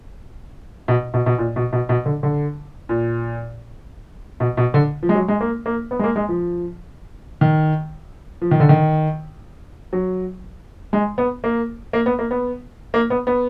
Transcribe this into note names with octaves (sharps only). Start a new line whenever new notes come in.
B2
B2
B2
A#2
B2
B2
B2
D3
D3
A#2
B2
B2
D3
F3
G#3
F#3
G#3
A#3
A#3
B3
G#3
A#3
G#3
F3
D#3
F3
D#3
D3
D#3
F#3
G#3
B3
A#3
A#3
B3
A#3
B3
A#3
B3
B3